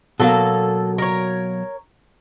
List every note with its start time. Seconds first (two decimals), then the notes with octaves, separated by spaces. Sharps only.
0.20 B2 F#3 A#3 A4
0.98 A#4 C#5